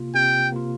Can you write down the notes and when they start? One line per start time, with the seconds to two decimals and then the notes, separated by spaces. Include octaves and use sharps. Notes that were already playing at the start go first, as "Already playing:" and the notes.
Already playing: C3 A#3 F4
0.14 C3 G5
0.52 A#3 F4